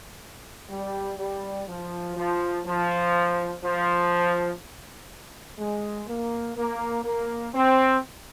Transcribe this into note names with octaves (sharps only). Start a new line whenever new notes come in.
G3
G3
F3
F3
F3
F3
G#3
A#3
A#3
A#3
C4